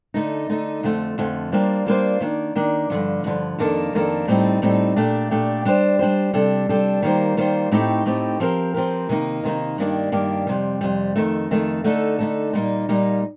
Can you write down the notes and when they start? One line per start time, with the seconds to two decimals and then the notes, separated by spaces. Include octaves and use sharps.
0.14 D3 A3 D#4
0.50 D3 A3 D#4
0.83 F2 D3 F3 A3
1.18 F2 D3 F3 A3
1.52 G3 A#3 D4 F4 C5
1.86 G3 A#3 D4 F4 C5
2.20 D#3 A#3 D4
2.56 D#3 A#3 D4
2.90 G2 D3 F3
3.24 G2 D3 F3
3.58 F2 D#3 A#3 D4 A4
3.93 F2 D#3 A#3 D4 A4
4.28 A2 G3 C4 D#4 A4
4.62 A2 G3 C4 D#4 A4
4.96 A#2 A3 D4 G4
5.31 A#2 A3 D4 G4
5.65 G3 D4 G4 C5
5.99 G3 D4 G4 C5
6.34 C3 G3 D4 A4
6.69 C3 G3 D4 A4
7.02 D#3 G3 A#3 F4 C5
7.37 D#3 G3 A#3 F4 C5
7.71 A2 A3 C4 D#4 G4
8.06 A2 A3 C4 D#4 G4
8.40 F3 C4 G4 A#4
8.74 F3 C4 G4 A#4
9.09 C3 D#3 A#3 D#4
9.44 C3 D#3 A#3 D#4
9.78 G2 D#3 A#3 D4 G4
10.12 G2 D#3 A#3 D4 G4
10.47 F2 C3 G3
10.81 F2 C3 G3
11.16 F2 D#3 A3
11.51 F2 D#3 A3
11.84 D3 A3 D#4 A4
12.19 D3 A3 D#4 A4
12.53 A#2 G3 A#3 D#4
12.89 A#2 G3 A#3 D#4